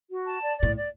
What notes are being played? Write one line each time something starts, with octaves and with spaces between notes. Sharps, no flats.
F#4
A5
D5
D5
A2
D5